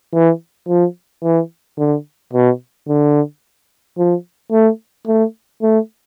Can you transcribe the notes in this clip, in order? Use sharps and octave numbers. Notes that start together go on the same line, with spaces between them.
E3
F3
E3
D3
B2
D3
F3
A3
A3
A3